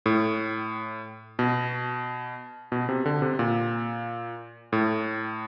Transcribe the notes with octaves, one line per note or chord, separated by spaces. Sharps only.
A2
B2
B2
C3
D3
C3
A#2
A2